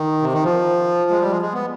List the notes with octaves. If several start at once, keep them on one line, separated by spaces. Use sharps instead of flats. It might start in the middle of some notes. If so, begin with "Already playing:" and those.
Already playing: D#3
C3
D#3
F3
G#3
G3
G#3
G#3
B3